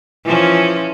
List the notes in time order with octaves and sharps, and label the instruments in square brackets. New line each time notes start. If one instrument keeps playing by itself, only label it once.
[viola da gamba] E3 F3 C#4